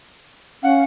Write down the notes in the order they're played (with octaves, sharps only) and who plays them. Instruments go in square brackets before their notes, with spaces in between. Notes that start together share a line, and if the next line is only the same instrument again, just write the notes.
[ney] C#4 [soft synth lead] F5 [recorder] F#5